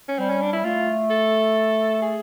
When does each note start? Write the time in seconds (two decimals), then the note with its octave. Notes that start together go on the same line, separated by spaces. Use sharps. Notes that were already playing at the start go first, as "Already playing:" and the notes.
0.08 C#4
0.19 G3 C4
0.30 C#4
0.41 D4
0.53 E4
0.64 A3 F4
1.10 A4
2.02 G#4